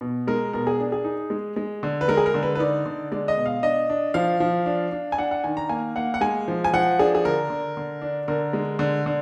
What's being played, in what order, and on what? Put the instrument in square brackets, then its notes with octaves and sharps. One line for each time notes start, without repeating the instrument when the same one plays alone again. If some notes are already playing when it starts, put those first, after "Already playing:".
[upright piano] B2
G#3 A#4
B2 A#4
G#4
D4
G#4
D#4
G#3
G#3
D3
B4
G#3 A#4
G#4
A#4
D3
B4
B4
D#4 D5
D3
G#3 D5
D#5
B2
F5
D4 D#5
D4
F3 F5
F3
D4
D4
G#5
D4 F#5
F#5
D#3 G#5
A#5
A#3 G#5
A#3 F#5
F#5
G#3 G#5
F3
G#5
F3 F#5
D4 G#4
G#4
D3 A#4
D3
D3
D4
D3 A#4
G#3
D3
D3